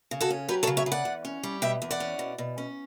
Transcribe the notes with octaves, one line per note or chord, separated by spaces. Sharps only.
C#3
F#4 A4
C#4
F#3 G4 B4
A4 C#5
C#3
C#5 E5
C#3
D5 F#5
E2
C#4
G3
B2 E5 G5
E2
D5 F#5
C#4
B2
B2
C#4